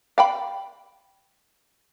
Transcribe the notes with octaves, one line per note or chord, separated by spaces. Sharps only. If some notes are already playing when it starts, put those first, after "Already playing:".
F5 G5 B5